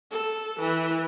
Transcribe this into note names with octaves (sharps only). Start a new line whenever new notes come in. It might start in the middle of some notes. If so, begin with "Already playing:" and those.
A4
E3